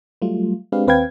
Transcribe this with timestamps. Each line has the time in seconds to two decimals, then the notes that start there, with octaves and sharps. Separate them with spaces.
0.22 F#3 G3 A3 F4
0.72 G#3 C4 D4 G4 B4 F5
0.87 D#2 C4 B4 F5 G5 G#6